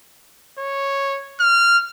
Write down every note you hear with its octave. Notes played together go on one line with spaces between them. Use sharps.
C#5
F6